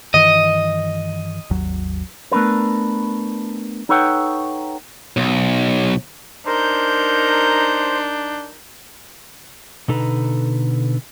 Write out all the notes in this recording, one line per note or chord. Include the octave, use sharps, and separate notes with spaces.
G2 D#3 E3 D#5
G#1 D#2 F#3
A3 B3 D4 A#4 B4
D#4 A4 B4 C#5 F#5 G5
B1
D4 D#4 A#4 C5 G6
B2 D3 D#4 A4 B4 A#5